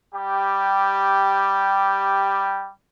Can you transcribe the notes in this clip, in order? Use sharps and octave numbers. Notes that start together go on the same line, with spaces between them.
G3 G4